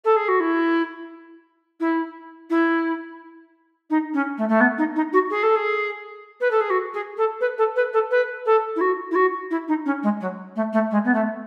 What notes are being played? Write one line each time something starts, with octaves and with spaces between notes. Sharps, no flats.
A4
G#4
F#4
E4
E4
E4
D#4
C#4
A3
A3
B3
D#4
D#4
F#4
G#4
A4
G#4
B4
A4
G#4
F#4
G#4
A4
B4
A4
B4
A4
B4
A4
E4
F#4
E4
F#4
E4
D#4
C#4
G#3
F#3
A3
A3
G#3
B3
A3